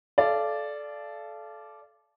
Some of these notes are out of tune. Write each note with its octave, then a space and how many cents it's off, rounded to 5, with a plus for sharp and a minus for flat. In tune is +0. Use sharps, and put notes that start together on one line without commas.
A4 -25 D5 +0 F5 -30